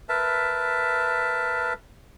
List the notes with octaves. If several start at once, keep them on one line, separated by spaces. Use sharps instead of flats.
A#4 B4 E5 A5